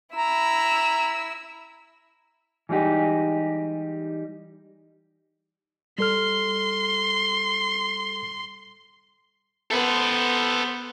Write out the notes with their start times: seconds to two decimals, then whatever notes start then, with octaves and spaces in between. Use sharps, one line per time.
0.16 E4 A#5 E6
2.69 E3 G3 G#3 D#4 G4
5.98 G3 A4 C6 F6
9.71 B3 A4 B4 C5